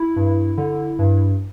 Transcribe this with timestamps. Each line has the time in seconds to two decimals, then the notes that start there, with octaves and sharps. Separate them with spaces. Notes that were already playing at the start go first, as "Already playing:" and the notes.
Already playing: E4
0.16 G2
0.57 D3
0.99 G2